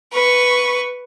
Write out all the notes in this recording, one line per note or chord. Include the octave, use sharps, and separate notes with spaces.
B4 C#6